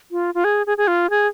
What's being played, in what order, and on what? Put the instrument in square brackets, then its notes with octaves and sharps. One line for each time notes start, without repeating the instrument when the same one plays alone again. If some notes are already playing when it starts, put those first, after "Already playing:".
[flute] F4
F4
G#4
G#4
G#4
F4
G#4